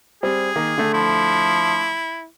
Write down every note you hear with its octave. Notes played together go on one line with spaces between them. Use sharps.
G3 C4 G#4
D#3 A#3
D3 A3
F3 E4